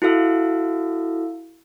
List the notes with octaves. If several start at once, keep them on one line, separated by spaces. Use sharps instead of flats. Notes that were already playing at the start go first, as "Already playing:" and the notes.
E4 F#4 A4 F5 E6